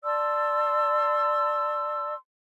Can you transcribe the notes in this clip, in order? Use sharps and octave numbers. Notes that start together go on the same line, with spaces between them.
D5 A5 C6 E6